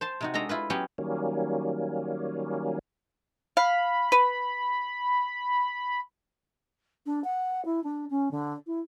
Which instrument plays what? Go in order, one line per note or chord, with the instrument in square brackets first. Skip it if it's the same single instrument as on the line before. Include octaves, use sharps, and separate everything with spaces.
[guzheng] C5 A5 C6
C3 D#4 F#4
G#3 D4 A4 D#5 A#5
E4 F4 B4
F#3 B3 C#4 G4
[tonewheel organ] D#3 F#3 G3 A#3 C#4
[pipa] F5 [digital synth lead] B5
[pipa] B4
[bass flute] D4
F#5
E4
D4
C#4
D3
E4